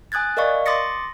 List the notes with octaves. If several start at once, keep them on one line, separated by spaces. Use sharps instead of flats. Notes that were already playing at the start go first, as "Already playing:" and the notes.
G#5 D#6 F#6 G#6 A6
A#4 D5 D#5 F5 C#6
C6 D6 D#6 A6 A#6 C#7